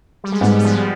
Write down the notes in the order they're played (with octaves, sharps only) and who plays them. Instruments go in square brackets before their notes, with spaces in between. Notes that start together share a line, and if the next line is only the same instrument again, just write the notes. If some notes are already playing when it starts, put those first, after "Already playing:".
[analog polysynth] G3
G#3
[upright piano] G#2 [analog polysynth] G3 B3
[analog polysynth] G3
F3 G#3